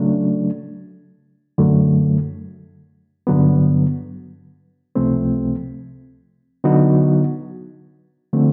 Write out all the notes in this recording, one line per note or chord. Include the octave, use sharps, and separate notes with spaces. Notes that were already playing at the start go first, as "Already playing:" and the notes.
Already playing: C#3 F#3 A3 D4
F#2 D3 F#3 A3
G2 D3 F#3 B3
C#2 C3 F3 A3 C4
D3 F#3 B3 D#4 F#4
D3 F3 A3 C4